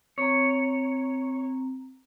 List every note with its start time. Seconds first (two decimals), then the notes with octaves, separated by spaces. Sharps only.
0.18 C4 C#5 A#5